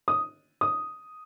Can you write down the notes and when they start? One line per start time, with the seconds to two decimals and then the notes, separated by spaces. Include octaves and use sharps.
0.08 D#6
0.61 D#6